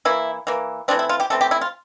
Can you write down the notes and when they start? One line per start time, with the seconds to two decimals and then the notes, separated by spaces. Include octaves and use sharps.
0.05 E3 A#3 E4
0.47 E3 A#3
0.88 E3 A3 C4 D4
0.99 E4
1.09 F4
1.20 G4
1.30 E3 A3 C4 A4
1.41 G4
1.51 E4
1.61 F4